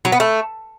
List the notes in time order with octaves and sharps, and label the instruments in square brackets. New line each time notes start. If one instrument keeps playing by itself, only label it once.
[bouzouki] F#3
B3
A3